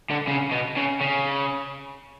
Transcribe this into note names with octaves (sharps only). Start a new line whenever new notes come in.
D3
C#3
B2
C#3
C#3